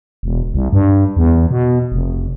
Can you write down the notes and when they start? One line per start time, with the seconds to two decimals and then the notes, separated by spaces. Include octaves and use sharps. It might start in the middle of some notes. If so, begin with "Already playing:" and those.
0.23 E1
0.54 C2
0.72 G2
1.17 E2
1.51 B2
1.92 F1